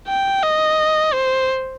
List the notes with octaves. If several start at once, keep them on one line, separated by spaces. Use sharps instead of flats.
G5
D#5
C5